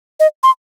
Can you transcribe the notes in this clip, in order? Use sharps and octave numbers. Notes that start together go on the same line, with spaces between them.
D#5
C6